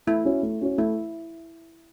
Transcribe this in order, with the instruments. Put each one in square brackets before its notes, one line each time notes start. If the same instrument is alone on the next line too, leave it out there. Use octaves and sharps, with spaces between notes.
[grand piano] A3 [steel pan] E4
[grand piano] C#4 F#4 C#5
A3
C#4 F#4 C#5
[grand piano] A3 [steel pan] E4